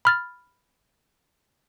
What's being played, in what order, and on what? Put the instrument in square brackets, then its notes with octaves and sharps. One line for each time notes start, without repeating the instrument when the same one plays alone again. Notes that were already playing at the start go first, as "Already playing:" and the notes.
[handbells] B5 F6 A6